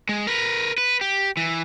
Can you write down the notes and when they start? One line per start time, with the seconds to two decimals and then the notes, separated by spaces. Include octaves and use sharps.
0.09 G#3
0.27 A#4 B4
0.78 B4
1.01 G4
1.37 E3